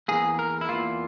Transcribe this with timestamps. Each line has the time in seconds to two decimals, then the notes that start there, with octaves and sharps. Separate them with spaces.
0.08 E2 E3 A#3 G#4
0.39 A#4
0.61 E4
0.69 E2 E3 A#3 F4